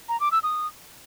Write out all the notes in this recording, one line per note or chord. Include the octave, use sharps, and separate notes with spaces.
A#5
D6
E6
D#6